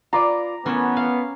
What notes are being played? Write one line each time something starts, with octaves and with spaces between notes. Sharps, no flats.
F4 B4 D5 A#5 D6
E3 A3 B3 C#4
F5